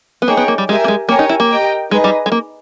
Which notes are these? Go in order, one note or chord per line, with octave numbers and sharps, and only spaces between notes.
B3
A#3 D#4 G#4 C#5 G5
B3
A#3
G3
G#3 G4 A#4 E5 G#5
A#3
G#3
A#3 G4 A#4 C#5 G#5
D#4
E4
A#3
G4 A#4 D#5 G5
G#3 D#4 G#4 B4 D#5
G3
G#3
A#3